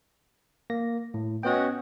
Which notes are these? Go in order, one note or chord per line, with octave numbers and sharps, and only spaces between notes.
A#3 A#6
A2
B3 C#4 F#4 D#5 G5